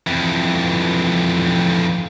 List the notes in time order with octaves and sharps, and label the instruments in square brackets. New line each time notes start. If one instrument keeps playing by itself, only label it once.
[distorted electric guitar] F2 E3